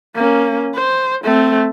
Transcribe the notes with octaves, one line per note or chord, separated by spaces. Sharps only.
A#3 C#4
C5
A3 C4